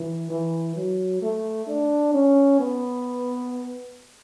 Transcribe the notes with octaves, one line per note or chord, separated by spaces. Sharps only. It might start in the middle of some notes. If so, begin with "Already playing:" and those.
Already playing: E3
E3
F#3
A3
D4
C#4
B3